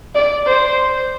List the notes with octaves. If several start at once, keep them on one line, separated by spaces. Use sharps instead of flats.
D5
C5